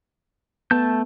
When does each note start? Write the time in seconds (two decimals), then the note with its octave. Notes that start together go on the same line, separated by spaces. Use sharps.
0.71 A3 B3 A5 G6